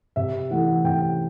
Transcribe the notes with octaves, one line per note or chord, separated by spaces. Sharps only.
C3 E5
E3 A3 F#5
C3 G5